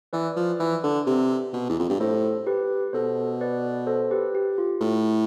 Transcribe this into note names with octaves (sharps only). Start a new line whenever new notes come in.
E3 B4 D5
F3
E3
D3
C3
B2
E2
F2
G2
A2 A4 C5
G4 B4
B2 A4 C5
B4 D5
A4 C5
G4 B4
G4
F4
A2 E4